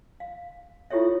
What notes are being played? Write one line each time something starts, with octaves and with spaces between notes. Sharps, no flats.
F5
E4 F4 G4 A4 C#5 E5